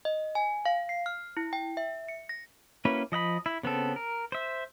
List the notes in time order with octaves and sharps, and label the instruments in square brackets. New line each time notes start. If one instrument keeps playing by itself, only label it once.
[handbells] D#5
G#5
F5
C7
F6
E4
G5
E5
C#7
A#6
[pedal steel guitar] A#3 C#4 E4 F#4 B4
F3 D#5 F#5 B5
E4
C#3 B3 C4 A4
A#4
C5 E5